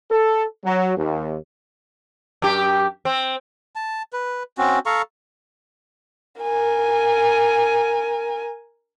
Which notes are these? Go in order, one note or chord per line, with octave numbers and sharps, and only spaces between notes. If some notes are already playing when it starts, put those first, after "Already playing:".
A4
F#3
D#2
F#2 G4
C4
A5
B4
C4 C#4 F#4
A4 F5 A#5 C#6
A#4 G#5